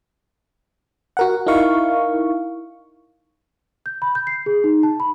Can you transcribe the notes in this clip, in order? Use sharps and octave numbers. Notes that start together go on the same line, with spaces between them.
F#4 A#4 F#5
D#4 E4 A#4 F5 C#6
G6
B5
G6
C7
G#4
D#4
A5
B5